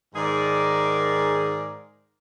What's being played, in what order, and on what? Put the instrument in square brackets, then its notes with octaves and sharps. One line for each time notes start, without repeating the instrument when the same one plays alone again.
[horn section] G#2 D#3 G#4 A#4 D5